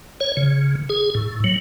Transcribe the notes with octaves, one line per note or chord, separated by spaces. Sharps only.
C#5
C#3
G#4
A2
F#3